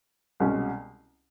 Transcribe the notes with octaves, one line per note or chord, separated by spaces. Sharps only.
C2 B2 G#3 C#4